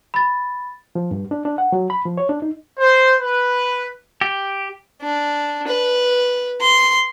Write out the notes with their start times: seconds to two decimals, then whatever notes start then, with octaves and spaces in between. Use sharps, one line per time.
0.14 B5 A6
0.95 F3
1.11 G2
1.31 D4
1.45 D4
1.58 F#5
1.72 F#3
1.90 B5
2.05 F3
2.18 C#5
2.29 D4
2.42 D#4
2.80 C5
3.22 B4
4.21 G4
5.02 D4
5.67 B4
6.61 C6